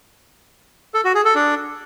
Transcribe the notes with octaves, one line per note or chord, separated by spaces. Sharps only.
A4
F#4
G#4
A4
D4